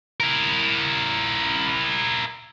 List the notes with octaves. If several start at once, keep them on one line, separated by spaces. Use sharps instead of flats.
E4 A#4